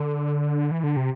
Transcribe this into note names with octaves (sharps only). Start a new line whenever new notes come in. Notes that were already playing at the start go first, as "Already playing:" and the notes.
Already playing: D3
E3
D3
C3